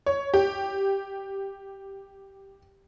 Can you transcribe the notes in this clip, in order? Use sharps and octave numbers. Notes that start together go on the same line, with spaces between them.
C#5
G4